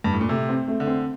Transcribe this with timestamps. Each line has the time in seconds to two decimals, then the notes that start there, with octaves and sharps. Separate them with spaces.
0.04 G2
0.13 A2
0.21 A#2
0.29 C3 A3
0.49 C4
0.68 A3
0.80 D3
0.87 C4